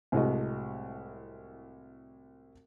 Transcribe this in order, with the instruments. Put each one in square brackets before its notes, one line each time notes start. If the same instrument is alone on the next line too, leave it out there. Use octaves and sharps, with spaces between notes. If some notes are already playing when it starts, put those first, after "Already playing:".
[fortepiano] C2 A2 C3 G#3 F#4 D#5